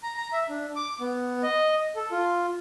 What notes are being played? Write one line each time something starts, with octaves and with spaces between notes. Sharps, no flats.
A#5
A#5
E5
D4
D6
B3
D#5
A4
F4